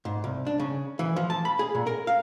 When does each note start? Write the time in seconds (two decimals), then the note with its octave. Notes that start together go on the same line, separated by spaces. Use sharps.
0.05 G#2
0.24 C2
0.47 D4
0.60 C#3
0.99 E3
1.16 F3
1.30 A5
1.45 B5
1.59 G#4
1.75 A#2
1.87 A#4
2.07 F5